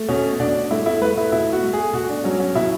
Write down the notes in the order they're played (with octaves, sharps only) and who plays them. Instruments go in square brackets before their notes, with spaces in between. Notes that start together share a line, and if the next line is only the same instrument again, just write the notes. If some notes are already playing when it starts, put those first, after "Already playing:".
Already playing: [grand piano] A3
B2 C#4
B2 D4
A3 E4
E4
A3 B4
E4
B2 E4
F#4
A3
G#4
B2 F#4
D4
F#3 C#4
C#4
B2 E4